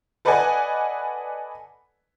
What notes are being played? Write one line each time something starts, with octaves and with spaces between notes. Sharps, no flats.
A4 B4 D5 D#5 F#5 G#5